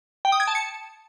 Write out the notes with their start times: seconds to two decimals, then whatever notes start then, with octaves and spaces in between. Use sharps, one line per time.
0.25 G5
0.32 D#6
0.40 G#6
0.47 A5
0.55 C#7